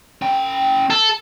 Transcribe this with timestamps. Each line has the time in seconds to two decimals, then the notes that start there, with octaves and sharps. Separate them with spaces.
0.22 C#4 G5
0.90 A4